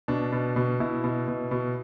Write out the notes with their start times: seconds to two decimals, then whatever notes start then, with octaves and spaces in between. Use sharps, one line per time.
0.08 B2 D4
0.32 B2
0.56 B2
0.80 B2 E4
1.04 B2
1.28 B2
1.51 B2